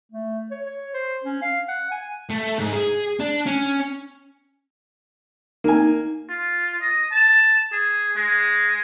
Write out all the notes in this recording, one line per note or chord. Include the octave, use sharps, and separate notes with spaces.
A3
C#5
C#5
C5
C#4
F5
F#5
G#5
A3
G#2
G#4
D4
C#4
A#3 D#4 G#5
F4
D#5
A5
G#4
G#3